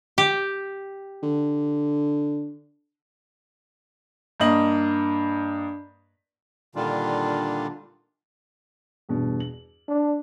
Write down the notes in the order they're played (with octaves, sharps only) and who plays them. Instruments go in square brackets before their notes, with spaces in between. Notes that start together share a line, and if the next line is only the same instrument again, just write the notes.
[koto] G4
[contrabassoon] D3
[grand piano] G2 A#3 D#5 F#7
[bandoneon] A#2 D3 D#3 G3 D4 F4
[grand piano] E2 G2 B2
F#7
[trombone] D4